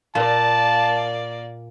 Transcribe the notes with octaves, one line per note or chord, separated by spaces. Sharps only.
A#2 A#3 D5 A5